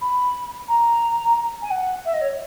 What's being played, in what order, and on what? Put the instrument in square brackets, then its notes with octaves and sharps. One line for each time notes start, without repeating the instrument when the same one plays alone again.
[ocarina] B5
A#5
G#5
F#5
E5
D#5
C#5